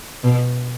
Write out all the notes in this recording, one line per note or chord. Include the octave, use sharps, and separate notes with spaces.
B2